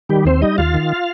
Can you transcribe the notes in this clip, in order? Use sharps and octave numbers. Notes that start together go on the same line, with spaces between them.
D#3 G3 G4
D#2 C4 C5
G3 D#4 D#5
D#2 F4 F5
D#3